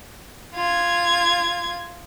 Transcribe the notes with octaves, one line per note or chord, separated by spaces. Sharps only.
F4 G#6